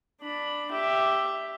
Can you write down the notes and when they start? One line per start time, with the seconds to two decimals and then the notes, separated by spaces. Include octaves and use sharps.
0.21 D4 B5
0.71 G4 E5